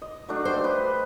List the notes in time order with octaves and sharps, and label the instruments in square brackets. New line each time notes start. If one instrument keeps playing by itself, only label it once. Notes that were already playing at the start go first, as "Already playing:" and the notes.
[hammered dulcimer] D#5
F#3 A3 D4
[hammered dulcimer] G4 [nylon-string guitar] C5
[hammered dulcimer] B4 D#5